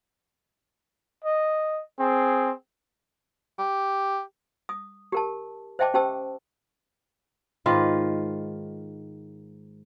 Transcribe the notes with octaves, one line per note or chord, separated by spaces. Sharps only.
D#5
C4 G#4
G4
D#6
G4 A#4 A5
C5 D#5 E5 G5 A5 D6
C#4 G4 C5 G5 A5 E6
G#2 D#3 F4 B4